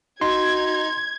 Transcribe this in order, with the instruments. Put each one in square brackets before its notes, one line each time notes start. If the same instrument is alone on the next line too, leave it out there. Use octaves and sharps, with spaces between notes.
[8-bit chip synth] D#4 [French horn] F#4 [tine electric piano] C6 [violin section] G#6